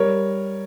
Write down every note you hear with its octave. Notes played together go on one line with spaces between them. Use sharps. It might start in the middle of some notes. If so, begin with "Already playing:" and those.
Already playing: G3 A#4 C#5